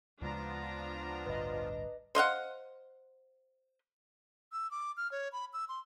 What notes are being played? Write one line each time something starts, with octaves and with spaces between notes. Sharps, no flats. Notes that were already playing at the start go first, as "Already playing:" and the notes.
D2 C#3 F3 G#3 B3 D4 F4 A#5
A1 D2 G2 B4 D#5
C5 D#5 F5 F#5
E6
D6
F6
C#5
B5
E6
C6